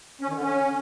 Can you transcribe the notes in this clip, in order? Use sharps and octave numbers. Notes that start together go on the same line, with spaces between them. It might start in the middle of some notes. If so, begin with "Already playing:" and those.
C#4
D#3
D3
C#4